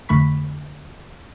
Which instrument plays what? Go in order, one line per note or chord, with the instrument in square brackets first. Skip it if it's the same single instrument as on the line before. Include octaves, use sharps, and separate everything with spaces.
[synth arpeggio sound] F2 D3 A3 B5 C#6 B6